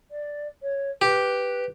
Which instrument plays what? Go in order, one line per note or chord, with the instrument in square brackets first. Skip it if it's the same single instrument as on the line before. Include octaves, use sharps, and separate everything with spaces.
[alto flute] D5
C#5
[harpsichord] G4 [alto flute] B4